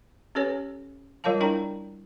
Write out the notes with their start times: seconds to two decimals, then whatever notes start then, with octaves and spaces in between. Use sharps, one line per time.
0.35 C#4 G4 A4 B4 C#5 G#5
1.24 G3 F4 A#4 C#5 F5 A5
1.40 D4 E4 A#4 D5 G5 A#5